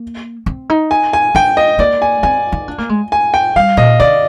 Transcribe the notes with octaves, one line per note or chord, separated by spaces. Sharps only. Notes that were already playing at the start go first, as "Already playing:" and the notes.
Already playing: A#3
C4
D#4
G#5
G#5
D4 G5
D#5
A#3 D5
G#5
C4 G#5
D#4
D4
A#3
G#3
G#5
G5
G3 F5
A#2 D#5
D3 D5